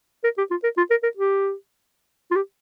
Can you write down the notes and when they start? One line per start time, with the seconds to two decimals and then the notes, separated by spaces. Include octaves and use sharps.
0.24 A#4
0.38 G4
0.51 F4
0.64 A#4
0.77 F4
0.90 A#4
1.03 A#4
1.17 G4
2.31 F4
2.36 G4